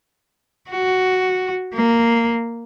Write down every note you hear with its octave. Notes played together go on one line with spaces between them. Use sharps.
F#4
A#3